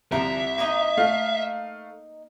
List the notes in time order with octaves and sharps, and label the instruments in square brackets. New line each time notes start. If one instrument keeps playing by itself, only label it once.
[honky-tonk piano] C2 [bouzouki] D3 F3 A#4 [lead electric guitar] E5
[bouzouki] A#3 D#4 D#5
[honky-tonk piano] A3 F5